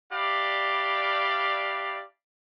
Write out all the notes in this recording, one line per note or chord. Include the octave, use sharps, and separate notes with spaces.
D4 E4 G4 D5 F5